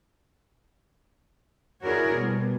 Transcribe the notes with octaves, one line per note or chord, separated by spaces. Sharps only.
E4 F#4 G#4 A#4 C#5 D5
B2 G3